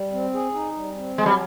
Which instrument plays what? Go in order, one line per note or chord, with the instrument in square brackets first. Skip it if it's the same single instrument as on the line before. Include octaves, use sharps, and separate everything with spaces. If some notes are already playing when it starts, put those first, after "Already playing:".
Already playing: [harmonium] G3
C4
G#4
D#4
G3
C4
[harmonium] F#3 [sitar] G#3
[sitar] G3